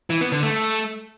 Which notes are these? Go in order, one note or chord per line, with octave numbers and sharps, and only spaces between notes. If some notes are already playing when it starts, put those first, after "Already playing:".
E3
B3
D3
A3